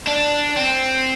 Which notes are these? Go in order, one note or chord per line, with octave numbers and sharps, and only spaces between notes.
D4
C4